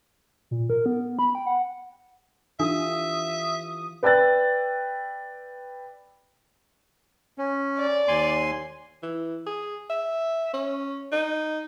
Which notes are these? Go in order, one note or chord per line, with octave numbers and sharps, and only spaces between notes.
A#2
A#4
B3
B5
G5
F#5
E3 D4 F4 G4 A4 E5 D#6
B4 D5 G5 E6 F#6 A6
C#4
D5
D#2 G#5 C6
E3
G#4
E5
C#4
D#4